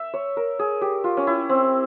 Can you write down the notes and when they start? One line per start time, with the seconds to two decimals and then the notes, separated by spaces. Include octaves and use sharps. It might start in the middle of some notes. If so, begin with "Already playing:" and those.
Already playing: E5
0.14 C#5
0.37 A#4
0.59 G#4
0.81 G4
1.04 F4
1.17 C#4
1.27 E4
1.49 C4